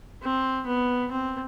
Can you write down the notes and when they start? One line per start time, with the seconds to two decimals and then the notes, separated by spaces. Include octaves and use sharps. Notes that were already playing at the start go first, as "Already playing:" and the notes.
0.22 C4
0.66 B3
1.11 C4